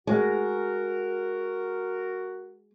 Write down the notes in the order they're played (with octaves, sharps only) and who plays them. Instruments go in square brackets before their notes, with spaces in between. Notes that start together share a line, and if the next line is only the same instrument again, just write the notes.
[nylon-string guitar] G#3 [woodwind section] F#4 A#4